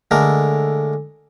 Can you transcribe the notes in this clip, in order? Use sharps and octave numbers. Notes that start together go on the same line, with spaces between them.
D3 G#3 A3 A#4